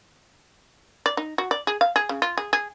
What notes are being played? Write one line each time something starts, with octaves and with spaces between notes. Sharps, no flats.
D5
D#4
F#4
D5
G#4
F5
G#4
C#3
F4
G#4
G#4